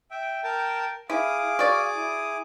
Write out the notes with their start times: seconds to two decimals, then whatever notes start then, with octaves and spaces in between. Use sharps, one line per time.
0.11 E5 G5
0.44 A#4 G5 A5
1.10 E4 G#4 F5 D6 D#6
1.59 F#4 D5
1.95 E4